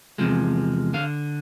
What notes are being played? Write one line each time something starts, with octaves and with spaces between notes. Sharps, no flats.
E2 C3 F3 G#3
D3 F5